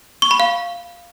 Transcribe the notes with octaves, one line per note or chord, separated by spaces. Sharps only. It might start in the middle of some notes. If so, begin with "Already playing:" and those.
C#6
B5
F5